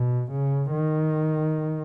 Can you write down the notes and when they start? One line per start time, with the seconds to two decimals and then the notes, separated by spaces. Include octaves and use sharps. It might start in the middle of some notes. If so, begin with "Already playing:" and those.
Already playing: B2
0.31 C#3
0.71 D#3